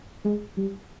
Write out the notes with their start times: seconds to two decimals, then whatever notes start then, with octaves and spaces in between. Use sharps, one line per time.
0.25 G#3
0.57 G3